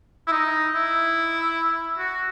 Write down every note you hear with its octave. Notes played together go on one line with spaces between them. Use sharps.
E4
D#4
E4
F#4